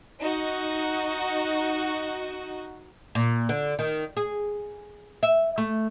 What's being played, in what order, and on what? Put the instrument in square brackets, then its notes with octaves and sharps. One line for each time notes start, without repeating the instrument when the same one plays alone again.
[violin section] D#4 F#4
[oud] A#2
D3
D#3
G#4
E5
A3